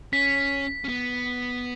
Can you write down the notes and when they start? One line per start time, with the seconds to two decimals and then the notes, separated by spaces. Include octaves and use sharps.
0.13 C#4 B6
0.84 C#4
0.88 B3